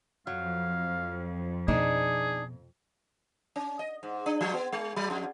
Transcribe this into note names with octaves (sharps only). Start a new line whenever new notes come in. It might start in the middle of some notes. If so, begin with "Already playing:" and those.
F2 F#3 F5
B2 D4 D#4 G#4
C#4
D#5
G#2
D4
F3
B3
G#3
F#3
F2